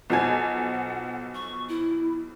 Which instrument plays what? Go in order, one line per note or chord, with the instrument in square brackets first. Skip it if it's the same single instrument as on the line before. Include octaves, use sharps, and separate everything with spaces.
[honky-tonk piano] B1 F3 G#5 [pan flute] F#5
[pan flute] C#6
E4